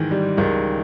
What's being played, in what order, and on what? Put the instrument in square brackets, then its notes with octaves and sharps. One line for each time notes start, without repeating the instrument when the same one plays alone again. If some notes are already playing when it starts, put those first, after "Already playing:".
Already playing: [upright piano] G#2 D#3 [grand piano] E3
[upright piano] G3
[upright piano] C#2 [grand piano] D#3